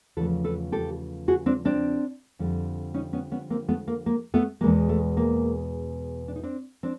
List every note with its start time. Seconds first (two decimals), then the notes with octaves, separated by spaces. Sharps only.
0.17 E2 C#3 F3 A3 A4 B4
0.44 A4 B4
0.72 G4 A4
1.28 F#4 G#4
1.46 C4 D4
1.65 C4 D4
2.39 F2 D3 G3
2.94 C#4 D#4
3.13 B3 C#4
3.32 B3 C#4
3.50 A#3 C4
3.69 A3 B3
3.88 A#3
4.06 A#3
4.34 A3 B3
4.61 E2 B2 G#3 A#3
4.89 A3
5.17 A#3
6.28 D4
6.36 D#4
6.43 C4 D4
6.83 C4 D4